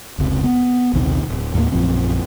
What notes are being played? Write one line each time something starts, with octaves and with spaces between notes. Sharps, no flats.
F1 C#2 C3
B3
A#1 D#2 C3 D#3
D1
D#2 A2 A3 A#3
A#1 F#2 F3 C4